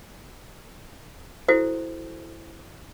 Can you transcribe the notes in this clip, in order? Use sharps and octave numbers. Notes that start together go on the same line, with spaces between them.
E4 F#4 A4 C5